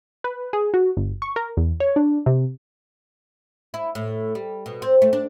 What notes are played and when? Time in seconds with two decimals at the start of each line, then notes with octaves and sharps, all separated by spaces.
0.24 B4
0.53 G#4
0.74 F#4
0.97 G1
1.22 C#6
1.36 A#4
1.57 E2
1.80 C#5
1.96 D4
2.26 C3
3.74 E4
3.95 A2
4.35 G3
4.66 B2
4.82 C4
5.02 A3
5.13 D4